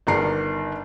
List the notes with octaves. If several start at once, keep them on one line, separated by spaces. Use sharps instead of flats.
G1 D#3 D4 A#5 C7